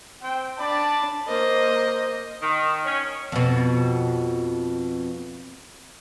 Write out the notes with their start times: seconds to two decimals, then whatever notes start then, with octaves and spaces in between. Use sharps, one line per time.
0.22 C4 G5
0.59 D4 D5 A5 B5
1.28 A#3 C5 D#5
2.41 D#3
2.85 C#4
3.32 F2 B2